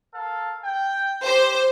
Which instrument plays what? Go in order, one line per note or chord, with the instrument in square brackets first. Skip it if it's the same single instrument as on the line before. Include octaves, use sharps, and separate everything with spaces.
[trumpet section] A4 A#4 F5
G5
[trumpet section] G4 [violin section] C5